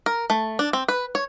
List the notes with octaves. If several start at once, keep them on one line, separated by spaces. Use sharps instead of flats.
A#4
A3
D4
C4
B4
C#5